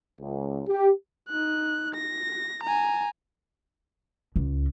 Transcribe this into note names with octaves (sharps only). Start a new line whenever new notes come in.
C#2
G4
D#4 F#6
A#6
G#5 A#5
C#2